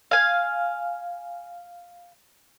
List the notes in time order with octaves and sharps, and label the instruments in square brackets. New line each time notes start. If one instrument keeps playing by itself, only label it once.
[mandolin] F5 G#5